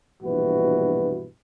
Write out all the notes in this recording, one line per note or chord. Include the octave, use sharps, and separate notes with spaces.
A#1 G2 B2 E3 F#4 B4